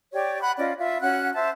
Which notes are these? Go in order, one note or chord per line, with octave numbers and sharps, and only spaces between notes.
G4 C#5 D5 C#6
F#5 B5 F#6
C#4 F4 D5 D#5
F4 E5
C#4 F#4 F#5 F#6
C5 E5 A5